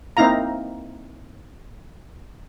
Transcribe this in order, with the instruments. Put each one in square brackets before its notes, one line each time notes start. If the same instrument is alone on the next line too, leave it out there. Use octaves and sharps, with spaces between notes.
[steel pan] A#3 C4 D#4 E4 F5 A#5